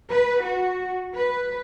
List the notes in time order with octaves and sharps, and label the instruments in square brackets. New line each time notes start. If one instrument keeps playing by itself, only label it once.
[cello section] B4
F#4
B4